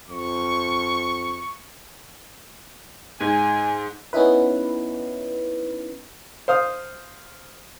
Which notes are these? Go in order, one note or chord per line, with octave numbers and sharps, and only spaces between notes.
F2 C#6
G#2 D#4 G#5
B3 C#4 D#4 E4 B4
C5 F5 D#6